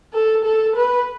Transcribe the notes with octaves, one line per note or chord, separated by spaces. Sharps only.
A4
A4
B4